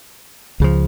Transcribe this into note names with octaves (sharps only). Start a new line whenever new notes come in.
C#2 C#3 F3